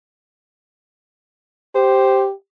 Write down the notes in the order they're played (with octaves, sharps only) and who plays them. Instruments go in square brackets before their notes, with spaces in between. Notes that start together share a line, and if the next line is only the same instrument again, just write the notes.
[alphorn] G4 [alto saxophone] C5